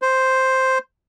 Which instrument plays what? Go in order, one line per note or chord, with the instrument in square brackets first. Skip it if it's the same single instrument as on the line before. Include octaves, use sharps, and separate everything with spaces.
[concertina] C5